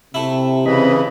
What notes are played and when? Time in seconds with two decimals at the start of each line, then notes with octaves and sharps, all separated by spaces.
0.14 C3 A3 E4
0.66 C#3 E3 C4 D#5 B5